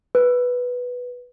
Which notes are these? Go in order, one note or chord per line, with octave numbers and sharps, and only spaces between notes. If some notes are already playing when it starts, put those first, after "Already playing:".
B4